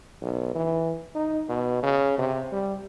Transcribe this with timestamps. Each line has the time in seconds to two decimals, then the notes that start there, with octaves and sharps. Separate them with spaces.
0.22 B1
0.55 E3
1.15 D#4
1.49 B2
1.83 C#3
2.19 C3
2.52 G3